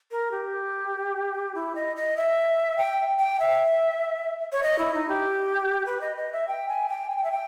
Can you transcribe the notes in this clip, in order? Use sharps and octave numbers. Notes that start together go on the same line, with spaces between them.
A#4
G4
E4
D#5
D#5
E5
G5
G5
E5
C#5
D#5
E4
D#4
G4
B4
D#5
D#5
E5
G5
G#5
G5
G#5
G5
E5
G5